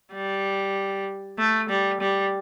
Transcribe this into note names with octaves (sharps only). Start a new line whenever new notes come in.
G3
A3
G3
G3